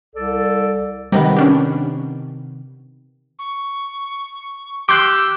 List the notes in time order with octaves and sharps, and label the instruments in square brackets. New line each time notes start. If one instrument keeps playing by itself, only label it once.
[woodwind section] C2 A4 D5
[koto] C3 D#3 B3 [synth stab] G3
[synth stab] C#4 D4 G4
[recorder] C#6
[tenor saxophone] G4 [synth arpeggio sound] C6 F#6 [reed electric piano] D6 [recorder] E6